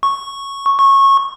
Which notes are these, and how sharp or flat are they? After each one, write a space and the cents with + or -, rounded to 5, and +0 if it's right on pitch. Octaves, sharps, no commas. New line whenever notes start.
C#6 -5
C#6 -20